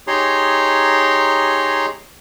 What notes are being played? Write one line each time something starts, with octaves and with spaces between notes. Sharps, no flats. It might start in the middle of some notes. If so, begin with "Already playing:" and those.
D#4 G4 G#4 C#5 A#5 C6